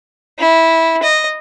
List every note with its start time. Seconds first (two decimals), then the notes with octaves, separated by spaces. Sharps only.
0.39 E4
1.03 D#5